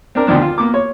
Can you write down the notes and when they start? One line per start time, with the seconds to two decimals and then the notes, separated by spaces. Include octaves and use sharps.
0.15 C4 D4 A#4
0.27 D2 B2 D#3 F3 D4
0.41 F4
0.58 A#3 B3 D6
0.74 C#5